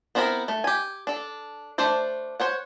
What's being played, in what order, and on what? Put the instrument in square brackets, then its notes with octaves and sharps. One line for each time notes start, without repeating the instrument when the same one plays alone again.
[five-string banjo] B3 C4 E4 G#4 A#4
A3
G4 G#5
D4 A4
A3 D4 C5 D5
C5 C#5 F#5